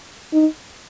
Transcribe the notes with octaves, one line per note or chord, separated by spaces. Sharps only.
D#4